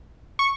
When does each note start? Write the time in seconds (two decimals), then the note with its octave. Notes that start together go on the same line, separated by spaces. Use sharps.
0.39 C#6